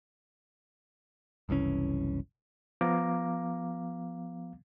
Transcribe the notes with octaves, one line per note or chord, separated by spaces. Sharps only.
F#1 C2 E3 C#4
F3 B3 F5 A#5 D6